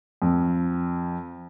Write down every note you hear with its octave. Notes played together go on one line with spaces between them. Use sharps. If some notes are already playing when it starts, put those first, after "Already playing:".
F2